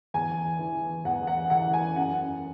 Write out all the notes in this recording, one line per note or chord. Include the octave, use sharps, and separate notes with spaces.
E2 G#5
E3
E2 F#5
F#5
E3 F#5
G#5
F#2 F#5